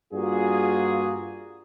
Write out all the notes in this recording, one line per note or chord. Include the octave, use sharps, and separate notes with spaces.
G2 A#3 F4 F#4 G#4